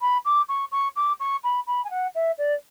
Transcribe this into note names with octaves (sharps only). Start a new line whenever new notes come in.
B5
D6
C#6
C#6
D6
C#6
B5
B5
G#5
F#5
E5
D5